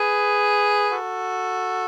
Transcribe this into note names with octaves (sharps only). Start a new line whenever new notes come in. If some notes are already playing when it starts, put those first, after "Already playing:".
Already playing: G#4 B4
F#4 A4